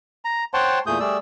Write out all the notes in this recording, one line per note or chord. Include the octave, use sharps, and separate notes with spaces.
A#5
C5 C#5 F#5 G5 A5 C6
E2 A#2 A3 G#4 D#6 G6
G3 A3 G#4 D5 E6